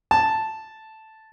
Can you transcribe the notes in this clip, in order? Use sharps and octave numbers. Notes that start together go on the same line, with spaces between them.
A5